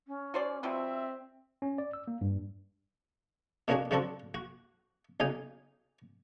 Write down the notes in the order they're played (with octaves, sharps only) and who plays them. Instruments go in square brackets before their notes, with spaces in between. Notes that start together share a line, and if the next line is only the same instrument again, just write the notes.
[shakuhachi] C#4
[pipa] F#4 C5 D5
[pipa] B2 F3 G3 [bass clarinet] C4 [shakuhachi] E5
[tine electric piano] C#4
D5
E6
A#3
G2
[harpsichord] B2 A#3 C#4 D4 F#4 G#4
C#3 F#3 C4 D4 F#4 A4
F#4
B1 C#3 D#4 G#5